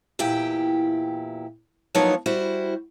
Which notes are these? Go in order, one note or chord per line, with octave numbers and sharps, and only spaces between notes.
E2 A#2 E4 G4 G5
F3 F#3 A#3 B3 D#4 C#5
G3 E4 F#4 C5